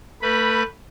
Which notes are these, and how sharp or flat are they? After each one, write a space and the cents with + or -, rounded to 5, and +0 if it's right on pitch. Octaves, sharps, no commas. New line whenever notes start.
A3 +30 B4 +0 B5 -15